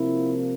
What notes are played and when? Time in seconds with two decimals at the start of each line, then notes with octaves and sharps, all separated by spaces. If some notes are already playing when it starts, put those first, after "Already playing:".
Already playing: C3 F3 A#3 E4